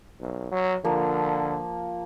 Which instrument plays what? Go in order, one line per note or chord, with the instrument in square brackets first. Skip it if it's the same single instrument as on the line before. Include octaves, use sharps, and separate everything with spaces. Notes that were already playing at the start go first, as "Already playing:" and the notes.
[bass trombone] B1
F#3
[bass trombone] D3 [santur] F3 A#3